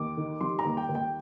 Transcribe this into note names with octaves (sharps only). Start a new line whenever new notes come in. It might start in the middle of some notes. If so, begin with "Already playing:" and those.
Already playing: D#2 D6
D#3
G3 C6
A#5
D#2
G5
D#2
G5